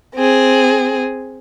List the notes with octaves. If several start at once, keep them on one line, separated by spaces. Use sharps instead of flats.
C4 G#4